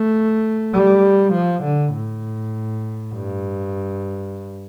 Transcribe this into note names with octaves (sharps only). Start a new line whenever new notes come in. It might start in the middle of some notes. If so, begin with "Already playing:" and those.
Already playing: A3
G3
F3
D3
A2
G2